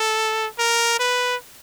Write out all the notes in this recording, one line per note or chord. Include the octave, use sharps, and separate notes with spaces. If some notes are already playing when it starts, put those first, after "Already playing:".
Already playing: A4
A#4
B4